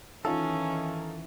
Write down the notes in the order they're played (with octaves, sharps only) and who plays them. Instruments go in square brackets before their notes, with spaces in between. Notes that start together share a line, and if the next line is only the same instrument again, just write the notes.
[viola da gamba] D#3 E3 [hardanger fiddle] C#4 [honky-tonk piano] D#4 F4 [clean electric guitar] A4